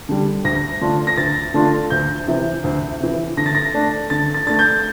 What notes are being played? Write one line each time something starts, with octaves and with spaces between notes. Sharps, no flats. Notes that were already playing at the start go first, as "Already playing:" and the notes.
D3 G3
D2 A#6
D3 A3 D4 F4
A#6
D2 A6
D3 A3 D4 F4
D2 G6
C3 E3
D2
C3 E3
D3 A#6
A6
A#6
A3 D4
D3 A6
A6
A3 D4 A6
G6